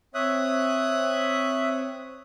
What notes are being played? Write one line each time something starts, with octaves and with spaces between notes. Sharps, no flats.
C4 C#5 E5 D#6 F#6